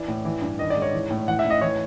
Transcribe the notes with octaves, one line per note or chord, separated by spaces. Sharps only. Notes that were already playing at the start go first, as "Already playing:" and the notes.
Already playing: E3 D5
A2
E3
G2
D#3 D#5
D5
G#2
C#5
E3
A2
E3 F#5
E5
A2
D#5
E3 C#5